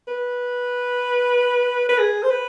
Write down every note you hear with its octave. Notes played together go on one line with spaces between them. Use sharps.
B4
B4
G#4
C5
B4